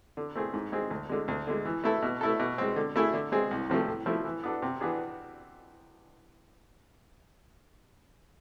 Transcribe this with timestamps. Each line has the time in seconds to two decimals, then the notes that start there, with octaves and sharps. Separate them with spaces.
0.17 D3
0.35 A3 C4 G#4
0.54 G#2
0.72 G#3 C4 G#4
0.90 D2
1.09 D3 G#3
1.28 D2
1.47 D3 G#3
1.65 E3
1.84 A3 E4 A4
2.02 B2
2.21 A3 E4 A4
2.40 B2
2.58 G#3 C4
2.76 D3
2.96 A3 E4 G#4
3.14 D3
3.32 G#3 C4 G#4
3.51 C2
3.70 C3 F3 A3
3.88 A2
4.06 F3 A3 E4
4.25 E3
4.44 B3 D4 A4
4.62 C3
4.81 E3 B3 D4 G#4